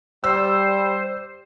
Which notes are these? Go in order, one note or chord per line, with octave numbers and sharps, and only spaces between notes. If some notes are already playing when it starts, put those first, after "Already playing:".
G3 C5 E6